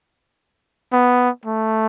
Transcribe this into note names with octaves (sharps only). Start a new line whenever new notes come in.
B3
A3